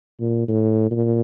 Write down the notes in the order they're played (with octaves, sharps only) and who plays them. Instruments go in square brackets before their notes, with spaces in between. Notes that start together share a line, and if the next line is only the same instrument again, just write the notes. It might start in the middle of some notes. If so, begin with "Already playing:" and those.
[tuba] A#2
A2
A#2